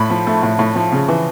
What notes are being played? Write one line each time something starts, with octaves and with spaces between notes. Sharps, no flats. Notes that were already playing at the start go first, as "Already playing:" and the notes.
Already playing: A2 B5
F3
A3
A2
A2
F3
C#3
E3